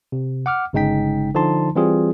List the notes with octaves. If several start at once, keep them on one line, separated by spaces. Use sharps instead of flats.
C3
F#5 D6 F6
G1 C#3 G#3 D#4 G5 B6
D3 F3 D#4 A5 C6
E3 G3 C4 F4 G#4